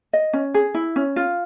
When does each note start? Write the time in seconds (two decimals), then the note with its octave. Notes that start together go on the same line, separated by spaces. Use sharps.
0.13 D#5
0.33 C#4
0.54 G#4
0.74 E4
0.96 C#4
1.16 F4